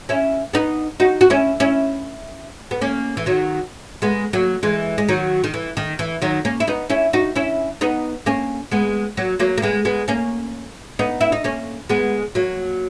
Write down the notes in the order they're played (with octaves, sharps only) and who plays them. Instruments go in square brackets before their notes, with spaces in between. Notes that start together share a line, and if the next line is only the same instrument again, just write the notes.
[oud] C#4 E4
B3 D#4
D#4 F#4
F#4
C#4 E4
C#4 E4
B3
A#3 C#4
E3
D#3 F#3
G#3 B3
F#3 A#3
E3 G#3
G#3
D#3 F#3
D#3
E3
D#3
E3
D#3 F#3
A#3 C#4
E4
B3 D#4
C#4 E4
D#4 F#4
C#4 E4
B3 D#4
A#3 C#4
G#3 B3
F#3 A#3
F#3 A#3
A#3
G#3 B3
G#3 B3
A#3 C#4
B3 D#4
E4
D#4
A#3 C#4
G#3 B3
F#3 A#3